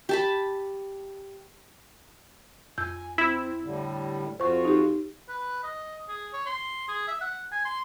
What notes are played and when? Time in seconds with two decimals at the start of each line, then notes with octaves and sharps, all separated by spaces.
0.09 G4 A5 B5
2.78 F2 G#5 E6 G6
3.18 C4 E4
3.64 A2 D3 G3
4.40 F2 F4 F#4 C5 C#6
4.65 D#4 G4
5.28 B4
5.63 D#5
6.08 G#4
6.33 C#5
6.46 C6
6.88 G#4
7.08 E5
7.21 F#5
7.52 G#5
7.65 C6